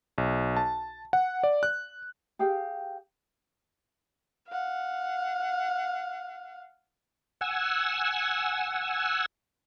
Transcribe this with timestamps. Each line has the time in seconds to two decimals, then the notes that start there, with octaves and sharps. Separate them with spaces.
0.18 B1
0.56 A5
1.13 F#5
1.43 D5
1.63 F#6
2.39 G4 G#4 F5 G5
4.48 F5 F#5
7.41 F#5 G#5 E6